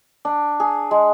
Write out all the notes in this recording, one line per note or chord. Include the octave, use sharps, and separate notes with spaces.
D4
G#4
G#3